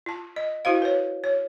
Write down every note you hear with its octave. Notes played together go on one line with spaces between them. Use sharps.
F4 A5
D#5
E4 F#4 C5 F5
B4 C#5
C#5